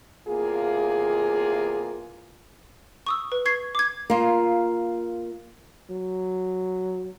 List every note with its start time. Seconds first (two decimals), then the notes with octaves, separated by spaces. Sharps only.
0.28 E2 C3 A#3 F4 G#4
3.06 C#6 D#6 E6
3.32 B4
3.45 C#6 G#6 C7
3.75 D6 G#6
4.10 A#3 F4
5.90 F#3